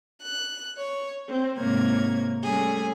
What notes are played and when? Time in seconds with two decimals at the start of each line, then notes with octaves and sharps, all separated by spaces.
0.22 F#6
0.78 C#5
1.30 C4
1.60 G#2 C3 A#3 C#5 G#6
2.44 G3 A3 C#4 G#4